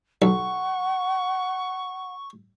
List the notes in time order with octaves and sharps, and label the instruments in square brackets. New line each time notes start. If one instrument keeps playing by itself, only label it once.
[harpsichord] B1 [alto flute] F#5 [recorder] C#6